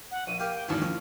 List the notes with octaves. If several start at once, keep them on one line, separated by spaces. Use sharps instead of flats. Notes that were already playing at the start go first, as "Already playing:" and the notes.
F#5
A#1 D#7
A#3 G4 F6
G5
G#1 D#2 E3 F#4 F6
F3 C#4